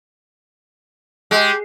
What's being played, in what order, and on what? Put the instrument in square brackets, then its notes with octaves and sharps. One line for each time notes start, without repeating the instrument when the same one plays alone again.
[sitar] G#3 [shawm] G4